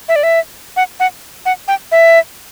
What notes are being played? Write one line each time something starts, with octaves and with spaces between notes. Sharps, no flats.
E5
D5
E5
F#5
F#5
F#5
G5
E5